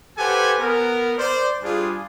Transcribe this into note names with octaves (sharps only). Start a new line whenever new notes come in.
G4 A4 B4 C5 F#5 G#5
B3 A#4
C5 D5
G3 D4 F4 G#4